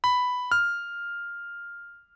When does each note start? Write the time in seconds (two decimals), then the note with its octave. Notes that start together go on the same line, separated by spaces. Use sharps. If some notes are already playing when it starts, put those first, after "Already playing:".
0.04 B5
0.52 F6